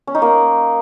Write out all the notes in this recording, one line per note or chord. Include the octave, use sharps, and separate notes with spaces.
C#4
D#4
A#3